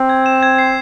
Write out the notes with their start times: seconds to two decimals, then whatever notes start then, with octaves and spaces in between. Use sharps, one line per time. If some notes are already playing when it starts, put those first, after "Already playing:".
Already playing: C4
0.09 G#6
0.26 E7
0.43 G#6
0.58 C7